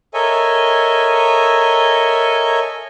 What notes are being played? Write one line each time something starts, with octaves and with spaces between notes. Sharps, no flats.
A4 A#4 C#5 D#5 E5 G#5